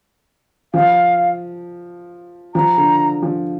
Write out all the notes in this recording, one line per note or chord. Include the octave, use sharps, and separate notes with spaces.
F3 F5
F3 A#5
D3
F3